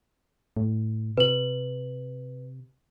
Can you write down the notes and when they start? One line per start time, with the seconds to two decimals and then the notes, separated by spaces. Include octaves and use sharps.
0.57 A2
1.17 C3 B4 F#7